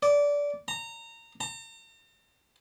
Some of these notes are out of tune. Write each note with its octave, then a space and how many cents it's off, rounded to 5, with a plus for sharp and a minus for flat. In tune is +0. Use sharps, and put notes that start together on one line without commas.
D5 -20
A#5 -25
A#5 -45